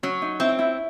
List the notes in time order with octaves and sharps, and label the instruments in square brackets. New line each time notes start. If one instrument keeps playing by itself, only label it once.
[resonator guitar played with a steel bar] F#3 [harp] C#4
[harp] D#4
[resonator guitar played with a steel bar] C4 [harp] E4
[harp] E4